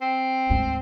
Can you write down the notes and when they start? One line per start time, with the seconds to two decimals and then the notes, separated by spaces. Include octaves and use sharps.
0.01 C4
0.50 D2 G#2